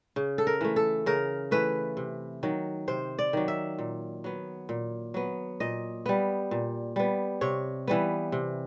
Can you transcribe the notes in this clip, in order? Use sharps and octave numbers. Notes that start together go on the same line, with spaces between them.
C#3
A4
A#4
E3 A3
A4
C#3 A#4
E3 A3 B4
C3
D#3 F#3
C3 C5
D5
D#3 F#3
E5
A#2
F#3 B3
A#2
F#3 B3
A#2 D#5
G3 B3
A#2
G3 B3
C3 C#5
E3 G3 B3
C3